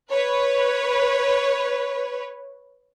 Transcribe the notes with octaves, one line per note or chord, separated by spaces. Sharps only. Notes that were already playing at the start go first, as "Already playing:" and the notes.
B4 C#5